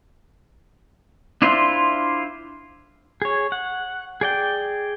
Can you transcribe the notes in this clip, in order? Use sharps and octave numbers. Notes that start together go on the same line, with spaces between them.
D4 E4 F4 C5
G#4 C#5
F#5
G#4 D5 G5